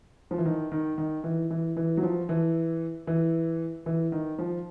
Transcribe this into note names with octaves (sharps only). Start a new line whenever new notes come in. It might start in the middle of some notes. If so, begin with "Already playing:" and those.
F3
E3
D#3
D#3
D#3
E3
E3
E3
F#3
F3
E3
E3
E3
D#3
F3